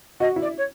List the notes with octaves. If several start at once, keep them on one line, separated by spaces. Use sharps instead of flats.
F#4 D#5
E4
D5
C#5